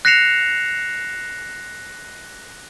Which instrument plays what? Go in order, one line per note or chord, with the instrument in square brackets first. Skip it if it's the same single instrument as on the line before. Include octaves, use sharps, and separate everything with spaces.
[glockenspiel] F#6 A#6 C7 C#7 E7 F7